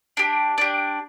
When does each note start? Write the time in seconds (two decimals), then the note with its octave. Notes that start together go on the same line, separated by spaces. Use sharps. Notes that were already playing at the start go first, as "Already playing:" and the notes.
0.17 D4 G4
0.58 D4 G4